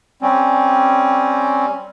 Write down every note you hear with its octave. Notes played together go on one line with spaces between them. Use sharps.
G3 C4 C#4